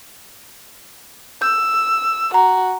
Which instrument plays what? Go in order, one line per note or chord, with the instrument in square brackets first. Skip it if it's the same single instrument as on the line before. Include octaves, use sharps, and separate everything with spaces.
[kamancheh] E6 [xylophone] G6
[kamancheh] F#4 [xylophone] A#5